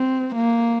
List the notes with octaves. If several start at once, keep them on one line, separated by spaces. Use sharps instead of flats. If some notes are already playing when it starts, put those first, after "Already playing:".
Already playing: C4
A#3